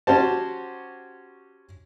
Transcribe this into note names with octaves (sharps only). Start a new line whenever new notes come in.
C#4 F#4 G4 C5 A5